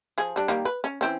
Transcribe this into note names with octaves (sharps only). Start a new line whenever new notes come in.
F3 G#4
G3 D4
D#3 G3 A#3
B4
C#4
E3 C4 C#4